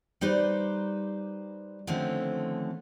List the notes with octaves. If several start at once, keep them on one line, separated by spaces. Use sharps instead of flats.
G3 D#4 G4 B4 C5
D3 D#3 F3 A3 C4 C#4